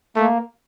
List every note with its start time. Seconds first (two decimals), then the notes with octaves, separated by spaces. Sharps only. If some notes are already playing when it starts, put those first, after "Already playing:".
0.16 A3 A#3